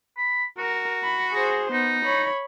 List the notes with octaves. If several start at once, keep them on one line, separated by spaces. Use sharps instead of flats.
B5
F#4 A#4
B5
G#4 C5
B3 D#4
C#5 B5